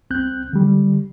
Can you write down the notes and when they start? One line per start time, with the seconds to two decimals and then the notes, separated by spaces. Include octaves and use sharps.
0.10 C2 C4 F#6 G6
0.53 D3 G3